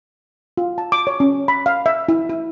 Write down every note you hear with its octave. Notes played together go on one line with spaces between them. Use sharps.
F4
A5
D6
C#5
C#4
B5
F5
E5
E4
E4